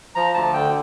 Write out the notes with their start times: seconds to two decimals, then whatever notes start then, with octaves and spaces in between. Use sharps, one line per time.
0.15 F3 A#5
0.34 D2 A5
0.53 D3 G5